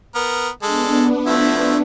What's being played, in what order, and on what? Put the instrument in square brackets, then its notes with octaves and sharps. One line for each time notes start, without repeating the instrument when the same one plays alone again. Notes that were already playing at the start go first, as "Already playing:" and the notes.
[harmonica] B3 A#4
[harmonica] G#3 A4 [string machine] B3 D4
[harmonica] F3 A3 E4